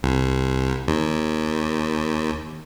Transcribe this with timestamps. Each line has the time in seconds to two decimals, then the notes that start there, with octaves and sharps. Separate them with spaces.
0.03 C2
0.88 D#2